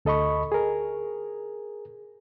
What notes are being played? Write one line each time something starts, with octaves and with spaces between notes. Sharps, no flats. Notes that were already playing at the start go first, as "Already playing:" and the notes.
D2 A4 D#5 B5 C#6
G#4 A#4